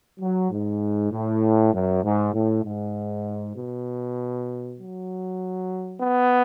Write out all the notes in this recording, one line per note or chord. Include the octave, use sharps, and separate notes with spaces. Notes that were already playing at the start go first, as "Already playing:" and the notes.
F#3
G#2
A2
F#2
G#2
A2
G#2
B2
F#3
B3